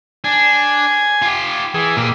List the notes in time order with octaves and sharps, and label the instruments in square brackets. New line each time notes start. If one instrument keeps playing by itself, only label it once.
[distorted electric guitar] D4 [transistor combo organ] G#5
[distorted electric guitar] F4 G4
[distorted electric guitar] E3 [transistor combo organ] G#4
[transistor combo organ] A#2 [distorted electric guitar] A#3 G4